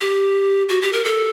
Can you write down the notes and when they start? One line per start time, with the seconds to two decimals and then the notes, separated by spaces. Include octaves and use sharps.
0.01 G4
0.69 F#4
0.82 G4
0.93 A#4
1.05 A4